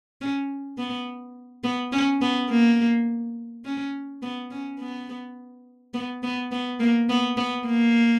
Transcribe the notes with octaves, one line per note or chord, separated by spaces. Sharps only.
C#4
B3
B3
C#4
B3
A#3
C#4
B3
C#4
B3
B3
B3
B3
A#3
B3
B3
A#3